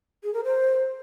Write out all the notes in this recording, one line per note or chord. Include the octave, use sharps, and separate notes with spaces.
G#4
A#4
C5